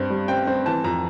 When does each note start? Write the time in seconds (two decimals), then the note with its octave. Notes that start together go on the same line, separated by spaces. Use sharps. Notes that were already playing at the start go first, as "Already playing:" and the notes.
Already playing: G2 C4
0.10 G3
0.28 C4 G5
0.47 C4
0.65 E3 A5
0.84 F2 A#5